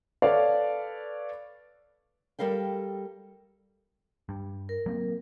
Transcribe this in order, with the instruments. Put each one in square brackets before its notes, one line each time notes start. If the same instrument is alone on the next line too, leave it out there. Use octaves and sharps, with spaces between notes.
[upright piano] A4 B4 C#5 D5 F5
[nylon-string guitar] G3 A4 A#4 F5 G5
[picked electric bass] G2
[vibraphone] A#4
[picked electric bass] F#3 A#3 C4